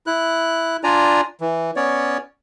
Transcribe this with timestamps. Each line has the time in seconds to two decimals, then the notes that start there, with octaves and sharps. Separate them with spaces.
0.07 E4 F#6
0.84 D4 F4 D5 G#5 A#5
1.41 E3
1.76 B3 C#4 C#5 D5